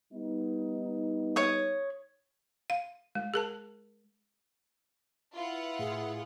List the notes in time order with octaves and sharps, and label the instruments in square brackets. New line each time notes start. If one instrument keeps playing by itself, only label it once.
[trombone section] G3 B3 D#4
[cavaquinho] C#5 D#6
[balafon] F5
G#3
G#4 A#4 A5
[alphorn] E4 [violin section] F4 B4 F#5
[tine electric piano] A2 [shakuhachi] G#4